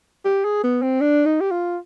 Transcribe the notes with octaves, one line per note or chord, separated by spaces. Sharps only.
G4
G#4
B3
C4
D4
D#4
G4
F4